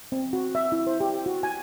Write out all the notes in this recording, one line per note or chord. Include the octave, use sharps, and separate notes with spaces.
C4
F#4
E5
E4
C5
G4
F#4
G#5